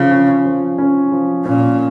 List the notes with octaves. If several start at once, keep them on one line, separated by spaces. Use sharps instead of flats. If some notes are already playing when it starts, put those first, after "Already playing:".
Already playing: C#3 F3 C#4
C#4
F3
C#4
F3
A#2 C#4